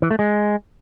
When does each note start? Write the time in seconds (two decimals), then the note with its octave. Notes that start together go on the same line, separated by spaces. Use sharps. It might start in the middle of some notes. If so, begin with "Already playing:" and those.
0.02 E3
0.11 A3
0.19 G#3